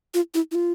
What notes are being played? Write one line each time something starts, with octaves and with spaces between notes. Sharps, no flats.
F4
E4
E4
F4